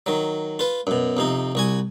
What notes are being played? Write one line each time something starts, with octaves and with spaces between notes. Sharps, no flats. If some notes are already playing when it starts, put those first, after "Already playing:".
D#3 F#3
F4 B4
F#2 B2
F2 C3 D#4
C2 F#4 G#5